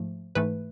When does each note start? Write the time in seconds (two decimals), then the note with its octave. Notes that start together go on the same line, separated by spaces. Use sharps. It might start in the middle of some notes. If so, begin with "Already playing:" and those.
Already playing: G#2 F3 A3
0.35 G#2 E3 A3 B4